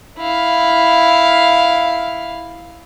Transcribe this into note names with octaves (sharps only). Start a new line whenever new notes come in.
E4 F5